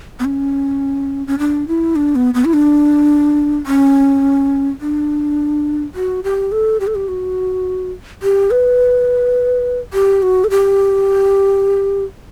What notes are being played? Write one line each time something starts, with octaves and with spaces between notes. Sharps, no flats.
B3
C#4
C#4
D4
E4
D4
B3
B3
E4
D4
C#4
D4
F#4
G4
A4
G4
A4
G4
F#4
G4
B4
G4
F#4
A4
G4